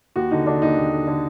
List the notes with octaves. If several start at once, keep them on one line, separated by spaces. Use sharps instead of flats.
D#2 F#4
D3 D#4
D3 D4
D#2 D#4
D#2
D3
D3